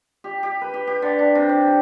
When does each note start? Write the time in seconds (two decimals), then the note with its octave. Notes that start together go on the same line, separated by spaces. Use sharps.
0.24 G4
0.43 G4
0.61 B4
0.74 G4
0.87 G4
1.02 D3
1.19 D4
1.35 C3
1.49 D5
1.67 G3